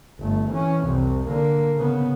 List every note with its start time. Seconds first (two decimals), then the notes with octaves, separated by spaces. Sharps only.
0.20 G1 A3
0.50 E3 C#4
0.85 C2 F2
1.28 D3 A#3
1.77 C#3 B3